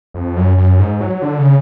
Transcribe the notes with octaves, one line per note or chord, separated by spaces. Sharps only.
F2
F#2
F#2
G#2
F#3
D3
C#3